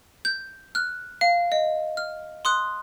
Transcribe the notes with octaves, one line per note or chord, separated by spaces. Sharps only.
G6
F6 F#6
F5
D#5
F6
C6 D#6 F#6